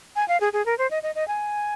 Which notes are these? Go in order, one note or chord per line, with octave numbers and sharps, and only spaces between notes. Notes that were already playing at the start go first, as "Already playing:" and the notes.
G#5
F5
G#4
G#4
A#4
C5
D#5
D#5
D#5
G#5